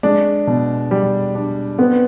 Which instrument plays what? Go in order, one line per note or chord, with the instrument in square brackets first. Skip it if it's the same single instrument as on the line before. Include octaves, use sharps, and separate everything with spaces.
[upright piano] G#3 [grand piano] D4
[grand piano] B2
G3
D4
[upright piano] B3 [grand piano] C4